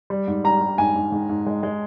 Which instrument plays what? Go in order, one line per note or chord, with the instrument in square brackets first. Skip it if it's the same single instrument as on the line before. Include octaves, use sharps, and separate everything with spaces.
[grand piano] G3
G#2
[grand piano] G3 [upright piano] A#5
[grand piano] G3
[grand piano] G#2 [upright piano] G#5
[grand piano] G#2
G#2
G#2
G#3
G#3